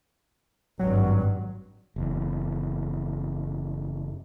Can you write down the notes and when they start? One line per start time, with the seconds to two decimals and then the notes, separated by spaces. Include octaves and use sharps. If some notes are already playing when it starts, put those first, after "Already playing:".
0.79 G#1 G2 F#3
1.96 F#1 E2